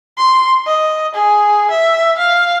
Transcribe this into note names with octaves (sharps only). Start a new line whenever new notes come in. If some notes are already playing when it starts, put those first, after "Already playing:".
C6
D#5
G#4
E5
F5